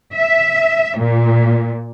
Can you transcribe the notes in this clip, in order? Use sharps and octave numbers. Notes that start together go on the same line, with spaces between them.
E5
A#2